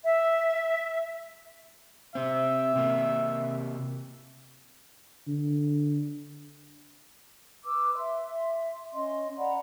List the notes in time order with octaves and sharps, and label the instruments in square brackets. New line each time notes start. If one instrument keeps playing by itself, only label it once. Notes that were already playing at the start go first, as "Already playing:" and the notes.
[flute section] E5
[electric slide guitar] C3 C4 [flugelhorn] E5
[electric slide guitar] C3 A#3
[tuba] D3
[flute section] B4 D6 E6
E5 C6
C#4 D#5 C6
D5 F#5 A#5 B5